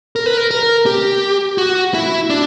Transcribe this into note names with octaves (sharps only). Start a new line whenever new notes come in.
A#4
B4
A#4
A#4
G4
F#4
E4
D4